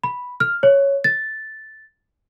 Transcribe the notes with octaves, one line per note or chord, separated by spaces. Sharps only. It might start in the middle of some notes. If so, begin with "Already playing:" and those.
B5
F6
C#5
A6